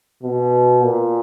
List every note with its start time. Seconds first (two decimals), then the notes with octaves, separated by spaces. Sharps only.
0.23 B2
0.83 A#2